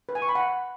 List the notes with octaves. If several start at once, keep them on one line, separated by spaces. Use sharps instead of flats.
B4
G#5
C#6
B5
F#5